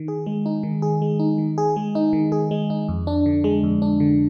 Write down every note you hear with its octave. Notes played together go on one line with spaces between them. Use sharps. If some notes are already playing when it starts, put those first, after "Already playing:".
Already playing: D#3
G#4
G#3
D#4
D#3
G#4
G#3
D#4
D#3
G#4
G#3
D#4
D#3
G#4
G#3
D#4
F2
D4
D3
G#3
F2
D4
D3